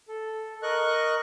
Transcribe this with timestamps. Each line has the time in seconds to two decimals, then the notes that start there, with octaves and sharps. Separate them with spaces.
0.08 A4
0.63 A#4 D#5 C#6 F#6